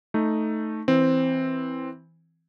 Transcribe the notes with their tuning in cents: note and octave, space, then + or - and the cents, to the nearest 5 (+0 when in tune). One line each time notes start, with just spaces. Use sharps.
A3 +0 D#4 +0
E3 -10 C4 +0